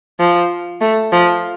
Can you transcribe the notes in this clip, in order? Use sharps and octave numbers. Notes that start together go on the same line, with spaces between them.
F3
A3
F3